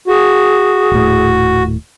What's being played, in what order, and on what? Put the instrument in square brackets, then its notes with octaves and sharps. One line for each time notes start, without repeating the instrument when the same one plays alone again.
[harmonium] F#4 [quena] G#4
[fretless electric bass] D#1 A2